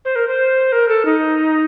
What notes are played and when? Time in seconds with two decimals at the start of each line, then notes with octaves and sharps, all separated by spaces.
0.05 C5
0.16 A#4
0.28 C5
0.72 A#4
0.89 A4
1.05 D#4